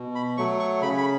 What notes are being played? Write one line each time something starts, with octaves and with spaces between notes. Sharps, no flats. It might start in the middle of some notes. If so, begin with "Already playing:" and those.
Already playing: B2
B5
F#3 A3 C#6
C#6
C#3 B5
B5